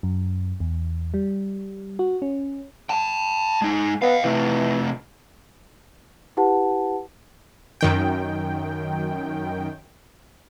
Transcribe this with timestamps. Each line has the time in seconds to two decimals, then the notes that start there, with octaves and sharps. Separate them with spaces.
0.03 F#2
0.60 E2
1.14 G3
1.99 F#4
2.22 C#4
2.89 G5 A5
3.62 G#3 D#4
4.02 B3 D#5 F5
4.24 C3 E3 A3
6.37 E4 G4 B4 F#5 A5
7.81 F#2 D#3 G5